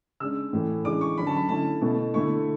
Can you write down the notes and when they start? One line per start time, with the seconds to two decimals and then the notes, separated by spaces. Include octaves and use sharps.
0.20 C#3 G#3 D4 E6
0.53 A2 E3 A3
0.85 C#3 E3 G#3 D4 D6
1.01 C#6
1.18 D3 F#3 C#4 B5
1.27 A5
1.37 B5
1.49 D3 A3 C#4 E4 A5
1.81 B2 A3 E4
2.14 D3 A3 E4 C#6